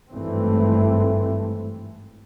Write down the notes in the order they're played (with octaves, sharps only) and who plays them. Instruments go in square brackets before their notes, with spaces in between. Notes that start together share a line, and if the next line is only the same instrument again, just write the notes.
[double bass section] G#1 G2 E3 A3 C4